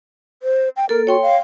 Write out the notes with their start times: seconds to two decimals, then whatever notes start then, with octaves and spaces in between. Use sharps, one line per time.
0.43 C5
0.76 G5
0.89 A#3 A4 A#4
1.07 F#4 C#5 G5 C6
1.22 F5